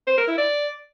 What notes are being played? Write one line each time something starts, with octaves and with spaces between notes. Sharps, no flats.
C5
A#4
E4
D5